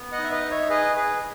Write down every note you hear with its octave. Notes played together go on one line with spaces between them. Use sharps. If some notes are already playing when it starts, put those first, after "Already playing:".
Already playing: B3
D#5 F#5
D#4
E5
B4 D#5
D#4
C#5 E5
G#4 B4 D#5
G#4 B4